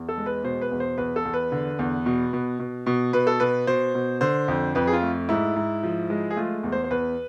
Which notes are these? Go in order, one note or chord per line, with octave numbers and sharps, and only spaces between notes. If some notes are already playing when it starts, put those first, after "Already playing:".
Already playing: E2
A4
G#3
B4
B2 C5
B4
E2
C5
E2 B4
A4
E2
B4
D3
E2
B2
B2
B2
B2
B2 B4
A4
B2 B4
B2 C5
B2
D3 C5
F2
F2 B4
G#4
F4
A3
G#2 E4
G#2
F3
G#3
G#4
A3 F4
E2
C5
C5
E2 B4